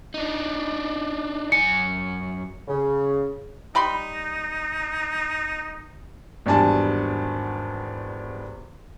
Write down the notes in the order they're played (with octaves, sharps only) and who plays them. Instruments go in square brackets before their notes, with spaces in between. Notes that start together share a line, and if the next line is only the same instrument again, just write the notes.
[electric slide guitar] D4 D#4
[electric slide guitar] F#2 G#5 [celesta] C#7
[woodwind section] C#3
[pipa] G3 B5 C6 [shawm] D#4
[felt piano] G#1 E2 G3 D4 G#5 A5